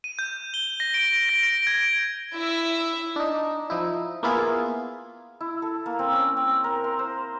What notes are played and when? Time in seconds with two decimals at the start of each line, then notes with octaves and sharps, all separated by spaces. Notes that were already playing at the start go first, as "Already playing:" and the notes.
0.04 D#7
0.19 G6
0.54 G7
0.80 A#6
0.94 D7
1.29 A#6
1.43 D7
1.67 G#6
2.34 E4 E5
3.16 D4 D#4
3.70 F3 D#4 E4
4.23 A#3 B3 E4 F4 G#4
5.41 E4
5.62 A4
5.86 A#3
5.99 C4
6.13 C#4
6.37 C4
6.64 A#4
6.84 C6
6.99 C5